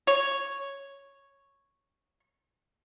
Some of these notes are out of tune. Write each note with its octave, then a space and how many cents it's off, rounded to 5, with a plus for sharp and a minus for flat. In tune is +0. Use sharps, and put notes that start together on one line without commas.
C#5 -5